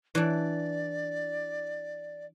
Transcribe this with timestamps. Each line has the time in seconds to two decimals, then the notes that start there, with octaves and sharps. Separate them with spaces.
0.15 E3 D4 D5